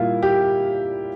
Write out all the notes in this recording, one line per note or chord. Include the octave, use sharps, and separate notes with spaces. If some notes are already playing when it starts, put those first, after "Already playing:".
Already playing: A#2 G3 A#3 E4 F4
G4